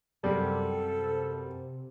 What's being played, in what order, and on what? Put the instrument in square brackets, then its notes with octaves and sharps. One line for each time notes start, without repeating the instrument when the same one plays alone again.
[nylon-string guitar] F#2 [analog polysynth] C3 [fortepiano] G3 [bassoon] A4